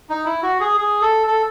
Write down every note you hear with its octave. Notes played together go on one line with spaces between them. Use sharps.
D#4
E4
F#4
G#4
G#4
A4
A4